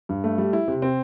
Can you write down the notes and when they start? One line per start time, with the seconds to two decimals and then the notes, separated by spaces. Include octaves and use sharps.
0.09 G2
0.24 A3
0.38 G3
0.53 E4
0.68 C3
0.82 C4